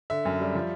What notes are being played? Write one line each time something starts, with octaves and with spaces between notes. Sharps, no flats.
D3 E5
F#2
G3
F3